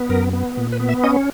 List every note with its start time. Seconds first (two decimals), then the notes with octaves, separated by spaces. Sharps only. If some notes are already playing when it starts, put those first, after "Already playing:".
Already playing: B3
0.09 F#2 A#4
0.33 B3
0.57 A#2
0.72 B4
0.80 B3
0.89 E5
1.04 C#4 D#5